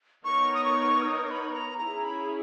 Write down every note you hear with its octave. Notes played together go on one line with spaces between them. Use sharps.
B3 D#4 A#4 C#5 C#6
D#6
C#6
F6
D#6
C#6
B5
A#5
C#4 E4 G#4 A#5
B5